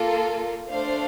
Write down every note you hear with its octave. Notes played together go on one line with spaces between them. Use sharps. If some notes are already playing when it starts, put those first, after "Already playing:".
Already playing: A#3 F4 A4
A3 D4 A4 C5 F5